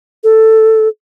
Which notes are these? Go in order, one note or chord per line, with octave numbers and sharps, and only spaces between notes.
A4